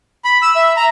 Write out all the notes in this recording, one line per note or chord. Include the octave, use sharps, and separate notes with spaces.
B5
E6
E5
A#5